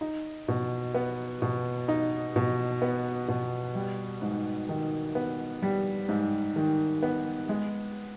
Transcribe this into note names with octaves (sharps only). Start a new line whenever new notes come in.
D#4
B2
B3
B2
D#4
B2
B3
B2
G3
G#2
D#3
B3
G3
G#2
D#3
B3
G#3